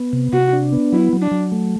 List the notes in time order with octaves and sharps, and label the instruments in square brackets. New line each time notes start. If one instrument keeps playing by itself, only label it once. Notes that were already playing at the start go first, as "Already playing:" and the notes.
Already playing: [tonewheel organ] B3
C3
[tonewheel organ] C3 [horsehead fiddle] F#4
[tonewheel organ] D4
B3
[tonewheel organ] F#3 [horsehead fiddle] E4
[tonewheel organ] F#3
[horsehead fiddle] D4
[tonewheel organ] F#3
A3